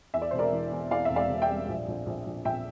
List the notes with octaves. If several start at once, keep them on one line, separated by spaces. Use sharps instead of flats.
E2 E5
D5
E1 C5
A#4 D5
E3
E2
E3 D5 F5
E1 E5
D5 F5
E1
E5 G5
G3
A#1
A#1
A#1
A#1
A#1 E5 G5